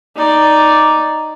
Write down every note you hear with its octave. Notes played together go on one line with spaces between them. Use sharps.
D#4 D5